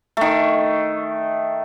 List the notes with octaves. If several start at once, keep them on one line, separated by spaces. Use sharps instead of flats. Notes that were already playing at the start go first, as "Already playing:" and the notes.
D#3 A3